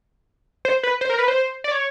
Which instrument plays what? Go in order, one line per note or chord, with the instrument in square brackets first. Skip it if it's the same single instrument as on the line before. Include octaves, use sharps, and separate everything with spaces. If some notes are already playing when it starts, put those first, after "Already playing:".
[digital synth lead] C5
B4
C5
A#4
B4
C5
D5
C#5